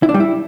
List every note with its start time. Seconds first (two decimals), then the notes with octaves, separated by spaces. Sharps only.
0.03 E4
0.09 D4
0.14 G3
0.20 E4